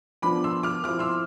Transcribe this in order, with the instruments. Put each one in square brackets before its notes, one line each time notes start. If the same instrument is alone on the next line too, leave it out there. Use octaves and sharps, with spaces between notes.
[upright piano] F3 B3 D4 B5 D6
C6 E6
D6 F6
F3 C4 E4 D6 F6
C6 E6